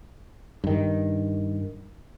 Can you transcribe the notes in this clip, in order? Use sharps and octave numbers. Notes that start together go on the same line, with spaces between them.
G2 D#3